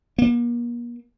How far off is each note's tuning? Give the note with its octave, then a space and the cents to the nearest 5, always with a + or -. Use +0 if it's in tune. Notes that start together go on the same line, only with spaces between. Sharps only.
A#3 +40